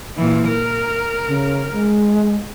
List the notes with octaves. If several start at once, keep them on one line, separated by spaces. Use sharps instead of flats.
A#2 E3
A#4
C#3
G#3